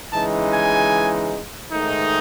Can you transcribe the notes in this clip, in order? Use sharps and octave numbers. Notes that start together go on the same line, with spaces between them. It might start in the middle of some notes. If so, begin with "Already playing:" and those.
C#3 E3 G#3 D#4 A5
G#5
G#2 D#3 A3 D#4